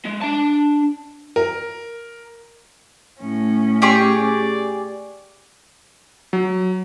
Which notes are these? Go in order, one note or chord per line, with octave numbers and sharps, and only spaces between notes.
G#3
D4 A5
A#4
A2 C#4
G4 G#4 D5 C#6
F#3